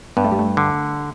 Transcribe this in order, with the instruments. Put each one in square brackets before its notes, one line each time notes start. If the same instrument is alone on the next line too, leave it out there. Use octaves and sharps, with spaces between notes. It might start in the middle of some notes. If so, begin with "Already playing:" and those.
[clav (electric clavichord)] G2 [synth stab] B3
[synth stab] A3
G3
A3
[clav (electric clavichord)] D3